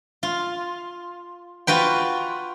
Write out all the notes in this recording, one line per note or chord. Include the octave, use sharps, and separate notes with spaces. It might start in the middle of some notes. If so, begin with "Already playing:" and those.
F4
F4 F#4 B4 G5